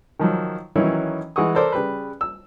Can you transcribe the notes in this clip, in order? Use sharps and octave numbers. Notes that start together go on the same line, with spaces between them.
D#3 F3 F#3
D#3 E3 F#3 C#4 D#4 E4
E3 G#3 F#5 C#6 D#6
A4 A#4 C5 D5 D6
C#3 G3 B4
E6